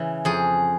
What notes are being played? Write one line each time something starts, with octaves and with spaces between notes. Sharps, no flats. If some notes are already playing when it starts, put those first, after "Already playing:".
Already playing: C#3 E3
F2 G#4